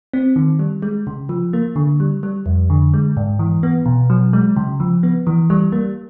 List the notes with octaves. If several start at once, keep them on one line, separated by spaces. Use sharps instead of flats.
C4
D#3
G3
G#3
C#3
F3
A#3
D3
G3
G3
F2
D3
G#3
G#2
E3
B3
B2
F#3
G#3
C#3
F3
B3
E3
G3
A#3